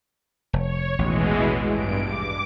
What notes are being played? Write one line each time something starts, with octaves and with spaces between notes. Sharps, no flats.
F1 C#5
A1 D#2 B2 E3 G#3
G2 D7
D6